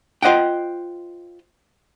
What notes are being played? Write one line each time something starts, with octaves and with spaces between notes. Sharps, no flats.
F4 C5 D#5 F#5 G5